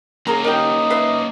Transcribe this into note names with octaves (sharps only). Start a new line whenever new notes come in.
A#3 C#4 G#4 A#4 A#5
D#4 G4 A#4
B4 E5 F5